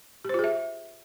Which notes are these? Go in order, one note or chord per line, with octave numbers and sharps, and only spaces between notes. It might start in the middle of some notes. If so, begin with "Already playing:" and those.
F4 G4 G#4 C5 E5